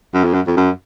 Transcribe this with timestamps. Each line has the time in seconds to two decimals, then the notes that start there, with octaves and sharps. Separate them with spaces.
0.14 F#2
0.24 F2
0.33 F#2
0.47 F2
0.57 F#2